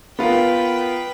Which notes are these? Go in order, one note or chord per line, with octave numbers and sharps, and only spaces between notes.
B3 F4 A#4 B4 G5